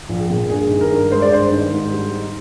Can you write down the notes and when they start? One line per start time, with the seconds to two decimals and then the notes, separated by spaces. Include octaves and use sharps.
0.09 A#1
0.19 G#4
0.30 A#2
0.50 G2 G#4
0.71 D#3
0.81 A#4
0.90 G2
1.11 G#3 C5
1.22 D5
1.31 G2 C5
1.52 D#3
1.72 G#2
1.92 G3
2.13 D#4